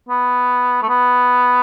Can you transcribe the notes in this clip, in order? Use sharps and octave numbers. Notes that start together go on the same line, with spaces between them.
B3
A3
B3